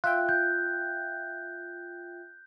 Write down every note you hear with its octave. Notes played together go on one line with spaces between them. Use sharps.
F4 E5 G5 F#6
G6